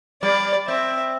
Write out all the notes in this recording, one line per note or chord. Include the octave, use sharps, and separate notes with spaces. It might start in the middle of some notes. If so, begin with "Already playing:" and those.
G3 D5
C4 E5